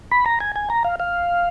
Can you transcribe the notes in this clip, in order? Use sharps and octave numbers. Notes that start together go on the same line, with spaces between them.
B5
A#5
G#5
G#5
A#5
F5
F5